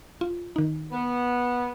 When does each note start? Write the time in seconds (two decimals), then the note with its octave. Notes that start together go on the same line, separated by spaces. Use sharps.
0.21 F4
0.56 D#3 D#4
0.92 B3